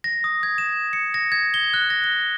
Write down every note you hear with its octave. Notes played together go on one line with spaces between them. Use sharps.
A#6
D#6
G#6
E7
C#7
A#6
G#6
G7
F#6
A#6
G7